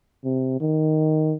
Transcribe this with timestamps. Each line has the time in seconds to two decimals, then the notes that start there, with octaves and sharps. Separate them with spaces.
0.24 C3
0.60 D#3